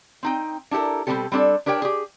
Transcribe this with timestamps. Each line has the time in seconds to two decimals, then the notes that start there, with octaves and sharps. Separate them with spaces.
0.23 C4 D#4 G5
0.71 D4 E4 G4 A4 A#4
1.07 B2 G3 A#3 C4 G4 A4
1.32 G3 C4 D4 G4 A4
1.66 D4 G4 A#4 C#5 G5
1.82 G4 G#4